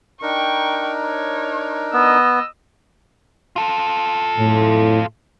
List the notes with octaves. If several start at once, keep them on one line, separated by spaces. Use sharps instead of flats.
D4 D#4 A#4 G5 C#6
C#5
B3 D#5 E6
F4 A4
A2